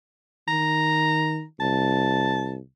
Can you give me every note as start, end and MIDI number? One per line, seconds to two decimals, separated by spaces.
0.48 1.43 51
0.48 1.42 82
1.60 2.58 36
1.60 2.53 81